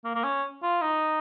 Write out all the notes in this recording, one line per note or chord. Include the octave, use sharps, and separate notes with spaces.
A#3
A#3
C#4
F4
D#4